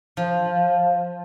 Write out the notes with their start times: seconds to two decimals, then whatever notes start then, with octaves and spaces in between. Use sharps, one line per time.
0.17 F3